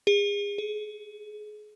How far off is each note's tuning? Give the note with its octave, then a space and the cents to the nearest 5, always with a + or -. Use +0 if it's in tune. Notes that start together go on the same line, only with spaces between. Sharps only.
G#4 -35
G#4 +30